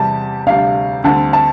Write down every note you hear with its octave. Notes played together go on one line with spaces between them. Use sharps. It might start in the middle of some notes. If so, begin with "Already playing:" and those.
Already playing: E2 C3 G3 A5
D2 C3 G3 D4 F5
D2 D3 G3 C4 A5
A5